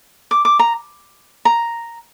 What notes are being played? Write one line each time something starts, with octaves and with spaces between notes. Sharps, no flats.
D6
D6
A#5
A#5